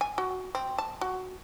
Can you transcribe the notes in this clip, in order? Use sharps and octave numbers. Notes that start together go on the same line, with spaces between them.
G#5
F#4
C4
A5
F#4